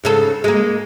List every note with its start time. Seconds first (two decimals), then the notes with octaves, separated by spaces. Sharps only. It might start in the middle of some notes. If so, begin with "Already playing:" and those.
0.03 G#2 C#3 A4
0.44 G#3 A#3